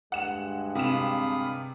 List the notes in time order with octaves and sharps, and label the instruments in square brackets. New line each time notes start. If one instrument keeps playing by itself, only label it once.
[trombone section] D2 G2 G#3 [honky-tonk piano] F#5 E7
[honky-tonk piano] C3 E7 [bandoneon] F5 B5 D#6